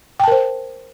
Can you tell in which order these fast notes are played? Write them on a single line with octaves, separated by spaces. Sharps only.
G5 A5 A#4 C5